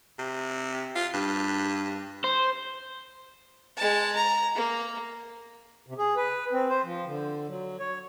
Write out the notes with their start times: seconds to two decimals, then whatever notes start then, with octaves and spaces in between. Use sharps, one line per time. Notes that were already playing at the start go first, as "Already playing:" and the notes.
0.19 C3
0.95 F4
1.14 G2
2.24 C5
3.77 G#3 A5
4.15 A#5
4.55 A#3
5.86 C3
5.98 G#4
6.16 B4
6.52 C4
6.69 C5
6.83 F3
7.06 D3
7.48 F#3
7.79 C#5